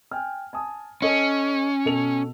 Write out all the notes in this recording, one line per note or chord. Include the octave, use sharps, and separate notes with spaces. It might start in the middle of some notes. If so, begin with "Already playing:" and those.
G5 G#5 F6
G#5 A5 D#6
C#4 A4 D#5 G#5
B2 A4 F7